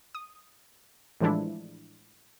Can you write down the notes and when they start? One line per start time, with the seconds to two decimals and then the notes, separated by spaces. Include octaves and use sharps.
0.15 D#6
1.21 A2 E3 F3 G#3 D4 E4